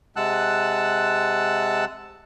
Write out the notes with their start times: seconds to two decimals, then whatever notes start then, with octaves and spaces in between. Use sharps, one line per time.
0.16 C3 G#3 F#5 A5 E6 F#6